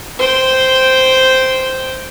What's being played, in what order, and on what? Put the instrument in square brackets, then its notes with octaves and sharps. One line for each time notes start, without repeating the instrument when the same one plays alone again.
[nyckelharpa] C5 G5